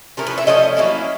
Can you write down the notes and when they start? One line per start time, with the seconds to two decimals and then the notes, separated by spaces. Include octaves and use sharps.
0.17 A2 F3 A3 C#4 A#4
0.27 B4
0.38 E5
0.47 A2 F3 A3 C#4 D#5
0.77 F#3 A#3 C#4 E4